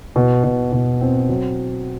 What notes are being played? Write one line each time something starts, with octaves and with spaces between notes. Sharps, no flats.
B2
B2
B2
C4
F#3